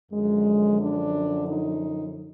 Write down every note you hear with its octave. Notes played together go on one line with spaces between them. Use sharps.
F#2 D3 F3 G#3
D4
D#4